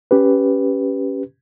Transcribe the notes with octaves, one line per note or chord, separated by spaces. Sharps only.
C#4 G4 B4